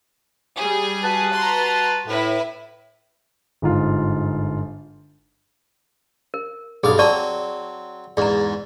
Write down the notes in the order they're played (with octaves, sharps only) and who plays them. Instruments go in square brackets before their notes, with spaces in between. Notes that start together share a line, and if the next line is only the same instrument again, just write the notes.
[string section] G3 G#4
[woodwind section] F#4 B4 A5
[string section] A#5 C6
[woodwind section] A2 [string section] E4 B4
[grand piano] G1 G#2 F4
[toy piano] A#4
[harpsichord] B1 G2 F5 [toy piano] G#4 D#6
[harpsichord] F#3 C4 [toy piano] D5 A5 C#6
[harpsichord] E2 G#2 [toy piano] D5 A#5